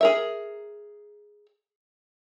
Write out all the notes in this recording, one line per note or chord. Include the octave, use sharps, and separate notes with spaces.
G#4 A#4 E5